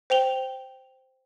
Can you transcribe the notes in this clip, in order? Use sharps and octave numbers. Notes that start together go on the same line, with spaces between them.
C5 G5 F7 G7